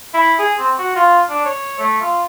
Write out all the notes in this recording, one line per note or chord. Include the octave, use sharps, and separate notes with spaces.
E4
G#4
C4
F#4
F4
D4
C#5
A3
F4